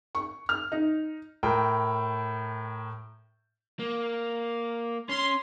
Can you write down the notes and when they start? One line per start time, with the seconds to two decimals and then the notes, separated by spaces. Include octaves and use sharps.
0.15 C#6
0.49 F6
0.72 D#4
1.43 A2 A#4 G5
3.79 A#3
5.09 C#4 C6